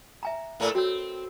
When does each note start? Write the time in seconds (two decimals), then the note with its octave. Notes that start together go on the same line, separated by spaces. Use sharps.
0.23 E5 G#5 A#5
0.60 A2 A3 A#3
0.75 C4 F#4 C#5